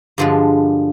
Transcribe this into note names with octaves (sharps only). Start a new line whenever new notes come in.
G2 D3 F3 G#3